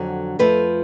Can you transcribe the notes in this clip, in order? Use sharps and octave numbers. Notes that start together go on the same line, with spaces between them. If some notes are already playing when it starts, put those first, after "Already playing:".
Already playing: F2 D3 F#3
F2 F3 A3 B4